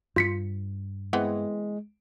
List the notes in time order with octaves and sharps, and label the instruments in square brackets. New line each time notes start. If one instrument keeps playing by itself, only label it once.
[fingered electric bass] G2 [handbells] F4 B6 C#7
[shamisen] E3 B3 C4 [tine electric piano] G#3